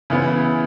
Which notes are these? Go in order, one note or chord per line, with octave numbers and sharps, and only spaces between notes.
C#3 E3 B3 E4